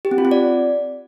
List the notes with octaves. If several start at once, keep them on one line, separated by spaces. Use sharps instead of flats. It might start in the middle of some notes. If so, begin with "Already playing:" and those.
G4
C4
F4
C4
D5